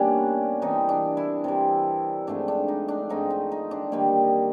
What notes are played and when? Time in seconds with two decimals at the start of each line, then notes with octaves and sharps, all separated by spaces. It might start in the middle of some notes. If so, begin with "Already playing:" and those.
Already playing: B2 G3 A#3 C#4 D4
0.62 C3 E3 G3 D#4
0.89 D4
1.17 E4
1.44 C3 E3 G3
2.27 G#2 F3 A3 C4 D4
2.48 D4
2.68 D#4
2.88 D4
3.09 G#2 F3 A3 C4 D#4
3.30 D#4
3.52 D#4
3.71 D4
3.92 D#3 G3 A#3 D#4